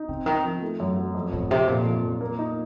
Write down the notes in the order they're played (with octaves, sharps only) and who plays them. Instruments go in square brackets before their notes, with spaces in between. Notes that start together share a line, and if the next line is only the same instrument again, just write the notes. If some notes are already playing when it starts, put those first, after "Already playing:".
Already playing: [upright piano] D#4
[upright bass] C#3 [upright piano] C4
[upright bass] D#3 [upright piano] C4
[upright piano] F3
A3
F#2
F#3
F2
[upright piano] F2 [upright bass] A2
[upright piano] F2 [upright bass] C3
[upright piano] F2 [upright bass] A#2
[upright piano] F2
F2
A#3
D#4